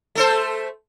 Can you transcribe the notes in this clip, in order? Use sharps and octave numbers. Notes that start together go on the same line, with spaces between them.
A3 A4 C5